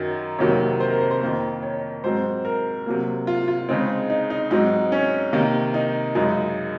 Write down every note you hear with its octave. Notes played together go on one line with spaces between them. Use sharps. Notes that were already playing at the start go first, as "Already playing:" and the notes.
Already playing: F#2 D#3 F#3
F2 C3 D#3 F#3 A#3 C#5
C5
A#4
C5
C5
F2 D#3 A#3
C#5
G#2 F#3 C4 C5
A#4
C3 F#3 A#3
F4
F4
C#3 G#3 C4 D#4
D#4
D#4
G#2 F#3 C4 D#4
C#4
C3 D#3 A#3
D#4
F#2 C#3 G#3 D#4